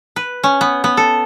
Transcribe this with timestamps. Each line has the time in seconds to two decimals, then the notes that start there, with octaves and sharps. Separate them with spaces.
0.16 B4
0.44 C#4
0.61 B3
0.84 B3
0.97 A4